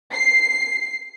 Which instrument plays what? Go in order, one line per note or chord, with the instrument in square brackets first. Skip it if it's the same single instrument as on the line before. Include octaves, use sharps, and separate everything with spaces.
[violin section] C7